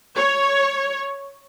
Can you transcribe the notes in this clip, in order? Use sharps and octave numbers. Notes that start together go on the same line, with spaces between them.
C#5